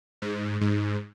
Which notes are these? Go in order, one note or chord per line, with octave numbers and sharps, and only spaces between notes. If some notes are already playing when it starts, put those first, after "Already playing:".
G#2
G#2